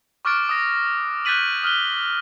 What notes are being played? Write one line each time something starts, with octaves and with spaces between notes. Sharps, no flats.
C#6 D6 F6 F#6 A6 D7
D#6 A#6
F#6 G6 A6 B6 D#7 F#7
D#6 F6 F#6 G7